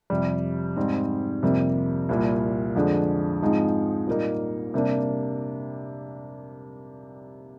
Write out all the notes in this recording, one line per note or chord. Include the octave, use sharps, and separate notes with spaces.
F2 C3 G3
G#2 G3 C4 D#4
F2 C3 G3 A#3
C2 A#2 G3
F2 D3 G#3 D4
G#2 F3 G#3 C4 D#4
A#2 G3 A#3 D#4
C3 G3 A#3 D4